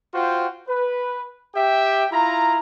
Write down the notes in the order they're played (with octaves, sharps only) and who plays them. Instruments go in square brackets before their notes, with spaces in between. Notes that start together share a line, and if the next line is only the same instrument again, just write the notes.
[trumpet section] F4 F#4 C5 G5
B4
G4 E5 G5
E4 F4 A#5